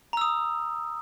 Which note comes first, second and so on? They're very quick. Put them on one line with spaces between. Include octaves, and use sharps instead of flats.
A#5 E6 D#6